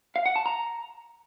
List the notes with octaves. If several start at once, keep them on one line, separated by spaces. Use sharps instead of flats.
F5
F#5
A5
A#5